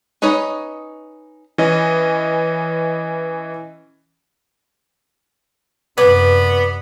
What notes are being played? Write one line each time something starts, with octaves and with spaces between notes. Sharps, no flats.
C#4 D#4 B4 C#5 D#5
E3 C#4 D#5
F#2 C3 B3 B4 D5